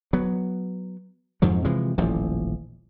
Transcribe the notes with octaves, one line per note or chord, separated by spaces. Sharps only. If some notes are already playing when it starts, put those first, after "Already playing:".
F#3 B3
F2 G#2 F3 F#3
C3 E3 F3 G#3
D#1 A1 F3